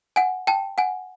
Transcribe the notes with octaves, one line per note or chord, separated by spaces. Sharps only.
F#5 G#5
G5 A5
F#5 G#5